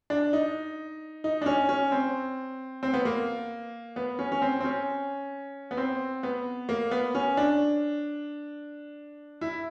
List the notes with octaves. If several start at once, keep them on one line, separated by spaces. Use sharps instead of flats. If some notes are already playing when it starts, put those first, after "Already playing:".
D4
D#4
D#4
D4
C#4
C#4
C4
C4
B3
A#3
B3
C#4
C#4
C4
C4
C#4
B3
C4
B3
A#3
B3
C#4
D4
E4